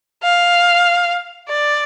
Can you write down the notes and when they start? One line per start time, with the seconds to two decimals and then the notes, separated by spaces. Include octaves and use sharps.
0.23 F5
1.49 D5